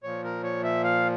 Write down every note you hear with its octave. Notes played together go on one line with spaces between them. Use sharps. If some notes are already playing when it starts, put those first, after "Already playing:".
A#2 F3 C#5
A#4
C#5
E5
F5